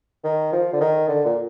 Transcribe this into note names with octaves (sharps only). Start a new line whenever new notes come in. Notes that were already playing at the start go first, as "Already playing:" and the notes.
D#3
F3
D3
D#3
D3
A#2